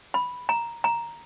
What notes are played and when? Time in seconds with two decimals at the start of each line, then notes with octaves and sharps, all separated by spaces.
0.14 B5
0.49 A#5
0.84 A#5